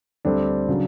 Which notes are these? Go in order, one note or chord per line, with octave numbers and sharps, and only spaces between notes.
D2 D3 G3 C4 D4
C#3 F#3